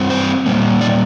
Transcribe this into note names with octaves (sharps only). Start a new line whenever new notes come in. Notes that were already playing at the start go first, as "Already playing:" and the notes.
Already playing: G2 G3 C4
C5
A#2 G3 A#3
D5